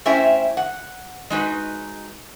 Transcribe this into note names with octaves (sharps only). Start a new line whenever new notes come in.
A3 C#4 E4 C5 E5 G5
F#5
G#3 D#4 F#4 B4